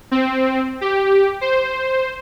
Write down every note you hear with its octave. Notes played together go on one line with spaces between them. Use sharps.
C4
G4
C5